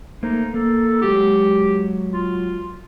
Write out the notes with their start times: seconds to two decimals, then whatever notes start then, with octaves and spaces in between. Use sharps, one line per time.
0.23 A3 A#3 D#4 C5
0.54 A#3 A4
1.02 F#3 G#3 F#4 G4
2.12 F4